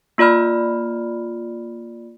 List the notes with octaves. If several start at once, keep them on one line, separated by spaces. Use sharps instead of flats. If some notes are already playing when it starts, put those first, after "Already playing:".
A#3 F4 D5 B5 F6